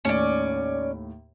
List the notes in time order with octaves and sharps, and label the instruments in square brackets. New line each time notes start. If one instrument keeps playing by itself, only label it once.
[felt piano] D#2 A2 [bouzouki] C#4 D5